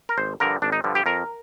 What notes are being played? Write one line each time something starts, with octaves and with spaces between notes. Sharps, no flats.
A#4
G#1 C5
G2 D3 F3 A#4
G#1 D4
D#4
G2 D3 F3
G4
F2 A#4